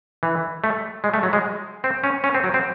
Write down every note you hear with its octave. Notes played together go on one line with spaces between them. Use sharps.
E3
A3
G#3
A3
F#3
G#3
C4
C#4
C#4
C4
F#3
C4